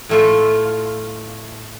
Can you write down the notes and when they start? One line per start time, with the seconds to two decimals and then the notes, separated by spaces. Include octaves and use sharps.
0.09 A2 A3 F4